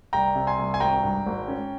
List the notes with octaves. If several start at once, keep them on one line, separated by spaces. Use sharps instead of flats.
C2 G5 A#5
C3
G#5 C6
C2
G#5
G#1 G5 A#5
G2
G#1
C#4